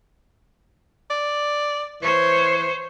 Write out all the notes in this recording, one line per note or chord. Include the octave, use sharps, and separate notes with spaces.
D5
E3 C5 C#5